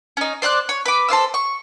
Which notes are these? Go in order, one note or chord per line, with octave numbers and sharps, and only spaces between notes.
C#4 D#4
C5 D5 E5 F#6
C#5
B4 D6
A4 C5 F5 E6
C#6